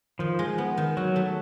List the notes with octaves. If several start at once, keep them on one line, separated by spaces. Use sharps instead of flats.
D#3 F3
G#3
B3
D#3
F#3 F#4
A3